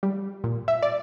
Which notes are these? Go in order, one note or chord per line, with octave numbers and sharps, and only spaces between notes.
G3
A#2
E5
D5